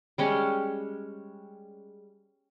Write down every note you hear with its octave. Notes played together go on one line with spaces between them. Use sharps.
G3 G#3 C#4